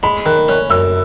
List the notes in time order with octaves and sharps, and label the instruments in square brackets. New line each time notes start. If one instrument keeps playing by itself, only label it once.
[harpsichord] G#3 [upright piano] B5
[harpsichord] D#3 [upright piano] F#6
[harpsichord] C#4 [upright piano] F#6
[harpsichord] F#2 [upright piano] E6